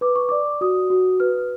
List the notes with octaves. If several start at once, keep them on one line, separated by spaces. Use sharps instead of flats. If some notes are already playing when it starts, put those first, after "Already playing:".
B4 D6
C#6
D5 D6
F#4 D#6
F#4
B4 F6